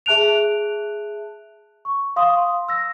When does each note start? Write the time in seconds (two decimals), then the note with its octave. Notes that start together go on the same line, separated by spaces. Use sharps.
0.06 G#4 E5 A5 F#6 D7 F7
1.85 C#6
2.16 F5 C6 D#6
2.69 E6 A#6